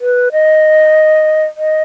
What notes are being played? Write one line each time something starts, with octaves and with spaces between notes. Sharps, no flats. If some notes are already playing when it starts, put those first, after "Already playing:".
B4
D#5
D#5